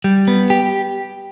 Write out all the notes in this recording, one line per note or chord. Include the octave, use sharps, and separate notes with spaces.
G3
B3
G4